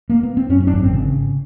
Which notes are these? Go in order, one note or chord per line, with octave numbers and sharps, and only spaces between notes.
A#3
B3
C4
F#2 C#4
C#4
D4
G#1
C4
C#3